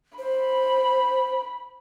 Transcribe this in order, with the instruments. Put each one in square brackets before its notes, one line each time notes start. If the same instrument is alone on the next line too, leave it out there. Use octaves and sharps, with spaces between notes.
[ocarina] C5 [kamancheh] B5